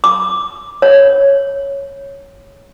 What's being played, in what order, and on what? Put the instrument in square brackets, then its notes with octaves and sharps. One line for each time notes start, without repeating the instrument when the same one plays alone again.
[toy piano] D6
C#5